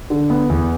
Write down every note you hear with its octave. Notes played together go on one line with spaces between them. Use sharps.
D3
B3
E2